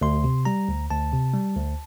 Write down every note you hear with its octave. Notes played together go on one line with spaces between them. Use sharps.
D2 C6
C3
G3 A#5
D2
D2 A5
C3
G3
D2